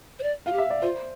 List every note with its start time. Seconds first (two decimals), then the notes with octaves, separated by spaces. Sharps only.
0.19 C5
0.23 D5
0.46 F4 F5
0.52 G4
0.58 E5
0.70 D5
0.82 F4 C5